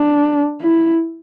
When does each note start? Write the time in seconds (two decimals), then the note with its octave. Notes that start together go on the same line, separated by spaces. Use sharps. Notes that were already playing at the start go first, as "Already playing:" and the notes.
Already playing: D4
0.62 E4